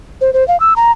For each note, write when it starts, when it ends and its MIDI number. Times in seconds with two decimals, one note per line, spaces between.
0.21 0.33 72
0.33 0.46 72
0.48 0.59 77
0.60 0.74 88
0.76 0.92 82